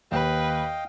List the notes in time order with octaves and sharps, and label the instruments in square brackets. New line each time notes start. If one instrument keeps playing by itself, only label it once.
[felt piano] D#2 [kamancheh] B4 [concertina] D#5 F5 G5